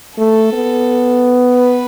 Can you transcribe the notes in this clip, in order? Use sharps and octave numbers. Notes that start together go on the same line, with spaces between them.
A3 A4
B3
B4